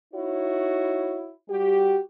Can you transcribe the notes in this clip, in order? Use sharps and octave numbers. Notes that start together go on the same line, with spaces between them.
D#4 E4 F#4 C#5
G3 F#4 G4